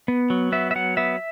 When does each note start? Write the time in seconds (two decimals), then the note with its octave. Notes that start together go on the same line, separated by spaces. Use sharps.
0.08 B3
0.30 F#3
0.52 B3 E5
0.71 E5
0.76 F#3 F#5
0.97 B3 E5